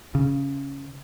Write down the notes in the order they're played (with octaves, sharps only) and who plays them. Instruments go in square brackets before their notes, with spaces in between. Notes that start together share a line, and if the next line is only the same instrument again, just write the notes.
[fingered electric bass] C#3